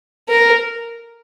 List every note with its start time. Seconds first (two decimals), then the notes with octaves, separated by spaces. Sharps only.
0.29 A#4